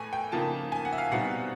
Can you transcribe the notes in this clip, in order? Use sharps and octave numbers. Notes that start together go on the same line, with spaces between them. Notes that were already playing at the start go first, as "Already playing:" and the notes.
Already playing: A2 E3 A3 G#5
G5
C#3 F3 A#3 D#4 A5
G#5
F#5
E5
F5
B2 G3 C4 D#4 F#5